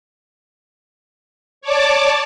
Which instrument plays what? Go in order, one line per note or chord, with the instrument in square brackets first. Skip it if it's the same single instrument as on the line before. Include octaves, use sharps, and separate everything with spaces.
[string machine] C#5 D5 A5 D6